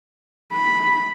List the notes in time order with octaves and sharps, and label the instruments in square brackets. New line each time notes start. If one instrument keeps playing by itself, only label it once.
[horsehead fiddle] B5